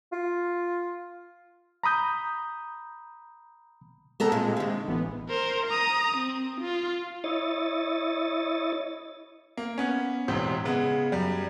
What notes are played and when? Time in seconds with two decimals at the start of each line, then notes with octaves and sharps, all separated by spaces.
0.12 F4
1.84 A#5 B5 D#6 G6
4.20 C3 G#3 B3 A4 A#5
4.32 A#2
4.57 D3 D#3
4.87 A1 E3 B3
5.29 A#4 C5
5.67 A#5 D#6
6.17 C4
6.61 F4
7.24 E4 C#5 D#5 A6
9.57 A#3
9.78 B3 C#4
10.28 E1 A1 C3
10.65 C#3 G#3 B3
11.12 F#2 G3